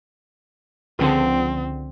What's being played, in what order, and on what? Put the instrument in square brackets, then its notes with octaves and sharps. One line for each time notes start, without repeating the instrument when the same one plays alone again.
[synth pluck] C#2 D3 F3 [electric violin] C4